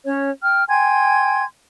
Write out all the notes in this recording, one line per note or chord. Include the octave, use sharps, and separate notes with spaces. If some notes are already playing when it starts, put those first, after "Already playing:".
C#4 C#5
G5 F6
G5 G#5 C6 G#6